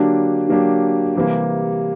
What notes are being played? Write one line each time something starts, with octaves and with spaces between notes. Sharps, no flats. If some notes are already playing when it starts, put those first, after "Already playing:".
Already playing: D3 F#3 A#3 D4 G4
D3 F#3 A#3 D4 G4
C3 E3 G3 A#3